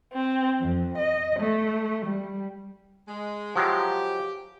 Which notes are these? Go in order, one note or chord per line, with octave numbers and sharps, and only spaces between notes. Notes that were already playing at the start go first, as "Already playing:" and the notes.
C4
F2
D#5
A3
G3
G#3
F3 F#3 G#3 G4